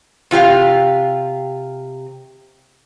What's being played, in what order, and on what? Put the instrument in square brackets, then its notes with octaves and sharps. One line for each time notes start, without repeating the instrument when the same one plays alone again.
[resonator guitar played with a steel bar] C3 F4 G4 F5